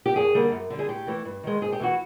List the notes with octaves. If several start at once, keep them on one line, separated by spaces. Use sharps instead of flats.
G4
F#2 G#4
D3 G3 A#3
F#2
D3 G3
G#4
A2 G4
E3 A3
G2
D#3 G#3
G#2 G#4
G4
E3 A3 F#4